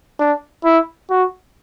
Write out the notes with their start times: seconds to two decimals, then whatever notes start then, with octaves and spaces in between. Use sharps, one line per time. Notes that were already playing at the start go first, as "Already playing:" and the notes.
0.19 D4
0.65 E4
1.10 F#4